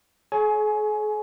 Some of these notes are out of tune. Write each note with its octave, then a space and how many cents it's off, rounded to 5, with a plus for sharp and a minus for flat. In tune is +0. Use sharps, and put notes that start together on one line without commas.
G#4 +45 C#5 +0 G#5 +20